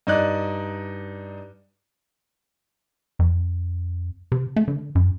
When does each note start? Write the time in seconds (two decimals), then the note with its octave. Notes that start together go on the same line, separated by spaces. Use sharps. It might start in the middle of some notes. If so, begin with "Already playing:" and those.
0.07 G2 D#4 D5 F#6
3.19 F2
4.32 C3
4.56 A3
4.68 D3
4.95 F#2